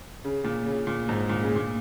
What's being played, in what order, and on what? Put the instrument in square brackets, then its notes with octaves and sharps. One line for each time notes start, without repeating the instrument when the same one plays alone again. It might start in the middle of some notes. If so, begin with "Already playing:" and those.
[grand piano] C#3
A#2
C#3
A#2
G#2
A#2
C#3
A#2